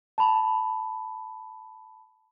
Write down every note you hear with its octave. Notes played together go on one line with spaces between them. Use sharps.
A5 B5